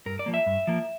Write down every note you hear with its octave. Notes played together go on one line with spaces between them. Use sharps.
G2 A#4
D5
F3 A#3
E5
G2
F3 A#3